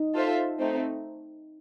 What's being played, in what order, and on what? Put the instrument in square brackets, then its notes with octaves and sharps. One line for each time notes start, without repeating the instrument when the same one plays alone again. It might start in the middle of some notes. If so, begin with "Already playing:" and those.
Already playing: [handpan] D#4
[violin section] F4 A4 C5 E5
A3 C4 D#4